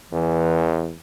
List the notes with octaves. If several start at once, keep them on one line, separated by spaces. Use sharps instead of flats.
E2 E3